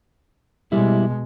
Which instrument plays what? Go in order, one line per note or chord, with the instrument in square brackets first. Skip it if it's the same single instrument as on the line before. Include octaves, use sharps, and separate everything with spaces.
[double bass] B2 G#3 [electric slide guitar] G3 E4